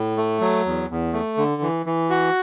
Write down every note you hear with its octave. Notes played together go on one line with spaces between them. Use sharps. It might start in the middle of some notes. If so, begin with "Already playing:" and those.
Already playing: A2
A3
F#3
E2
E2
A3
D3
E3
E3
F#4